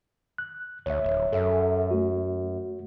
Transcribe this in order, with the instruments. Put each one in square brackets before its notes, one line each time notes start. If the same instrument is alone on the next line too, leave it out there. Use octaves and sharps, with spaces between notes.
[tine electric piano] F#6
[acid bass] D2 [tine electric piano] C#5 E5
[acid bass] D1
[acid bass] F#2 [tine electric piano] A4 E5
[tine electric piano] A3 F#4